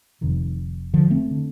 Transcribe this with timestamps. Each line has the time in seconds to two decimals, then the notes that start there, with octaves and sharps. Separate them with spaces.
0.21 F1 F2 C3 D#3
0.94 D3 F3
1.10 A3 C4
1.31 D3